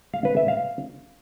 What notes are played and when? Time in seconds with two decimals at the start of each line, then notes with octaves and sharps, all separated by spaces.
0.14 F5
0.25 B4
0.37 E5
0.48 F5